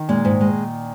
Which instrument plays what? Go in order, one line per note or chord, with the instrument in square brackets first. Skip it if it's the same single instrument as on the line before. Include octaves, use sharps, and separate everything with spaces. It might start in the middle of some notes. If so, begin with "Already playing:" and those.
Already playing: [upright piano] D#3
[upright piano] A#2 [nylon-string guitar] G#3
[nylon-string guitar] G#2
G#3